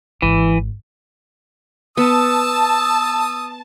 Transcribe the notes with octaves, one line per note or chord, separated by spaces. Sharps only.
G#1 E3
B3 A5 D#6 E6